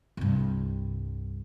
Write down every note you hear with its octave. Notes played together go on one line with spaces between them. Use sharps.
C2 G2